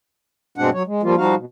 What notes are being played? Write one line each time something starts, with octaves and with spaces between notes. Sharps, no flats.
G2 B2 G#3 C4 D4 F#5
F#3 C#5
G#3
F3 G3 A#3 F4
F3 G3 D#4 F#4 F5
B2